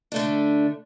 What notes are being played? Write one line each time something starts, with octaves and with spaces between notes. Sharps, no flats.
D3 A3 D4